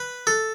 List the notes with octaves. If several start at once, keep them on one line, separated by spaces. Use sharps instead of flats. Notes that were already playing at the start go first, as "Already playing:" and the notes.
Already playing: B4
A4